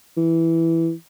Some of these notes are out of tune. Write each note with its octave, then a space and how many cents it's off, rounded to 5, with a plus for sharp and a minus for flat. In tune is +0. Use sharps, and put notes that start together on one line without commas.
E3 +0